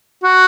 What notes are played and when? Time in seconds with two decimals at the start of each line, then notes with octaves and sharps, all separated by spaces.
0.24 F#4